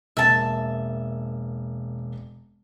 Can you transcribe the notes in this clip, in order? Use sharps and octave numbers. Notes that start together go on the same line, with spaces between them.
E1 A#3 E5 A5